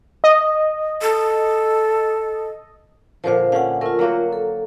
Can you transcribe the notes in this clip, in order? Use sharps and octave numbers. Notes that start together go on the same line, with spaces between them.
D#5
A4
A#2 D3 F3 A#4 C5 F5
D3 C#4 F5 F#5
A3 F4 A#4
F#3 A#3 F#4
A4